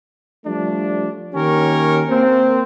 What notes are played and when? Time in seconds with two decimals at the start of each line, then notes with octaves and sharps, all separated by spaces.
0.45 F3 G3 A3 D4
1.34 D#3 A#3 C#4 G4 A#4 C#5
2.09 A#3 C4